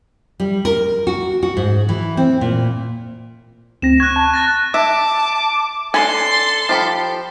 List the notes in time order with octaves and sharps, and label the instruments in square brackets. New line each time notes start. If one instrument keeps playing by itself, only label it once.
[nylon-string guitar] G3
A#4
F#4
F#4
G#2
E3
C4
A#2
[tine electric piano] D2 C4 A#6 [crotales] E7
[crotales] C#6 F#6 [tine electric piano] G#6
[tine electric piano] A5
[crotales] F#6 A6 A#6
[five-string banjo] E5 [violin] A5 [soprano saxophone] D6
[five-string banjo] D4 G#5 [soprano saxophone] A4 [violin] C6
[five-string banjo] F3 G4 B5